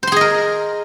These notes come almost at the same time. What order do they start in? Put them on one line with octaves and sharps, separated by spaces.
C5 C6 G#4 D#5 A#4